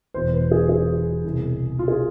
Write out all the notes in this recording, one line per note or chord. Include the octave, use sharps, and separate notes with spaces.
E1 E2 B2 C5
B4
G#4
G#4
C2 B2
F4
G#4